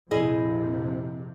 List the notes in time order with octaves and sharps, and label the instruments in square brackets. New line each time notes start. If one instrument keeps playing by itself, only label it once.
[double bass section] A#1 F2 C3 [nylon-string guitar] E4 G#4 D#5